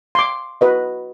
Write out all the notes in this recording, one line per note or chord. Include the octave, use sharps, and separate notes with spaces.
C6 D6
F#4 B4 D#5